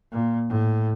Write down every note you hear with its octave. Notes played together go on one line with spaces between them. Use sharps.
A#2
A2